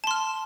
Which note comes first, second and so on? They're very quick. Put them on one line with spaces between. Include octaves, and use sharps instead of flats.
A5 C6 F6